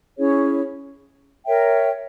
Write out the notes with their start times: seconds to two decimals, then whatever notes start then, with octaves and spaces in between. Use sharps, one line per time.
0.17 C#4 E4 G#4 C#5
1.45 A#4 C#5 E5 G5